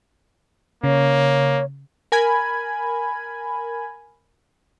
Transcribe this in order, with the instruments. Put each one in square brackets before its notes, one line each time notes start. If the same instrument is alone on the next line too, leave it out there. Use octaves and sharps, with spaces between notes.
[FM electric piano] C#3 [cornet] A#3 [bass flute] C#5
[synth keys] A#4 G#5 B5 G#6